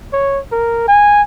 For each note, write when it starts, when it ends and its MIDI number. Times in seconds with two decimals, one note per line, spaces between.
0.13 0.40 73
0.52 0.83 70
0.88 1.22 80